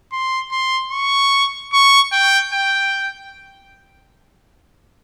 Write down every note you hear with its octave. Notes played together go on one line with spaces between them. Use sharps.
C6
C6
C#6
C#6
G5
G5